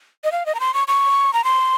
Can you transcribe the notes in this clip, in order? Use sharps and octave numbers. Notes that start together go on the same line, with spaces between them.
D#5
F5
D#5
A#5
C6
C#6
C#6
A#5
C6